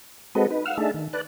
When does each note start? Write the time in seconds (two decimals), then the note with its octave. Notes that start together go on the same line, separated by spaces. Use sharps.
0.35 G#3 C4 F#4 A4 B4 D#5
0.50 D#4 B4
0.65 F5 F#5 E6 F6
0.77 A3 D4 D#4 G#4 E5 A5
0.94 D#3
1.13 B4 D5 A5 F#6